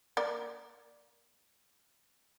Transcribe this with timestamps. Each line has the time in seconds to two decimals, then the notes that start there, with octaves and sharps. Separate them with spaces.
0.17 A#3 D5